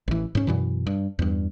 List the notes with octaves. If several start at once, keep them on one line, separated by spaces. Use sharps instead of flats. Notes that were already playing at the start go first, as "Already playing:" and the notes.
A1 E3
G#2 C#4
F#2 B2 E3
G2
E2 G2